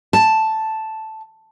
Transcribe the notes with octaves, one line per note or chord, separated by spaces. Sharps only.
A5